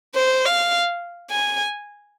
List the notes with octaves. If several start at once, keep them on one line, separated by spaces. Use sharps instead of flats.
C5
F5
G#5